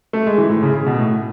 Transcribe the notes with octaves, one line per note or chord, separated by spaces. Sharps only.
A3
G#3
E3
A2
C#3
C#3
B2
A2